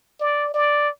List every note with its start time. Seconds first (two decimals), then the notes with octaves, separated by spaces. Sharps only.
0.20 D5
0.54 D5